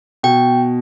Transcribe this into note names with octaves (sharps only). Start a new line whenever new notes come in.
B2 G5